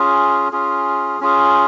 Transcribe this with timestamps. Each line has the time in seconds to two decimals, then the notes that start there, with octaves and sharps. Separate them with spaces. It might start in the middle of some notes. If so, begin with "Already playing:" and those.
Already playing: C#4 F4 G#4
0.52 C#4 F4 G#4
1.21 C#4 F4 G#4